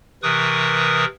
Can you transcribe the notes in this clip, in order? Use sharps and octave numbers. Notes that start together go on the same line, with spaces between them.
C3 E3 A#4 B4 C#6 D#6